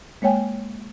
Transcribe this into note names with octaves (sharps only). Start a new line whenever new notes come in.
G#3 A#3 C#5 G5 G#5